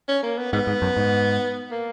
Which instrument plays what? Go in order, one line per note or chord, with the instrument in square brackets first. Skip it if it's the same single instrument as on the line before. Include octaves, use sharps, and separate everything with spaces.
[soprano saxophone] C#4
A#3
B3
[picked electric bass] G#2 [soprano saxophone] B3
[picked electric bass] G#2
F#2
G#2
[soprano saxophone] A#3